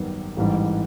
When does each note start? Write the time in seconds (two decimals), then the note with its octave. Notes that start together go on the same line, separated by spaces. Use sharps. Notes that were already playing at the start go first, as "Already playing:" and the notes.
Already playing: G#1 F#2 D#3 G3 B3
0.37 A1 G#2 E3 G3